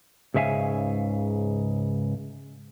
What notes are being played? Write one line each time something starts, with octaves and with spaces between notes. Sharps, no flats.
C#2 G#2 C#3 E5 F5 G#5